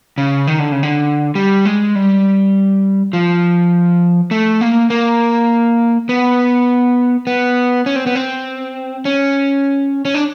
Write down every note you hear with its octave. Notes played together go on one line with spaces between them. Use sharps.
C#3
D#3
D3
C#3
D3
G3
G#3
G3
F3
A3
A#3
A#3
B3
B3
C#4
C4
B3
C4
C#4
C#4
D4